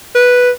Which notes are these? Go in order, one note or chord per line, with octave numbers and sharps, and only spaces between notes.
B4